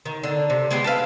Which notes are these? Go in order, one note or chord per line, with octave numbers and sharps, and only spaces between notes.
D#3
D3
C3
G#3 B3 G4 G#4
A4 B4 F5